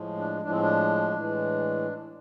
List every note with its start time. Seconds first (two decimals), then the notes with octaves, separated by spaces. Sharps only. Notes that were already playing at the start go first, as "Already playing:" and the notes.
Already playing: A2 F3 G#3
0.17 D4
0.41 A2 F3 G#3 D4
0.51 C4
0.60 D4
1.14 A2 E3 G#3